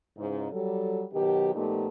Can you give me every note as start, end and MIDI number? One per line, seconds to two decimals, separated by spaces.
0.17 0.47 44
0.17 0.47 49
0.17 0.47 52
0.52 1.04 54
0.52 1.04 55
0.52 1.04 69
1.13 1.50 47
1.13 1.50 51
1.13 1.50 54
1.13 1.50 67
1.55 1.87 46
1.55 1.87 53
1.55 1.87 57
1.55 1.87 59
1.55 1.87 63
1.55 1.87 67